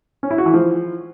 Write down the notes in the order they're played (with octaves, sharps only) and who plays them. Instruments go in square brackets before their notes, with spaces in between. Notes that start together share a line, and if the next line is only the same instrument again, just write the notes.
[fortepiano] C#4
E4
F#4
E3
F3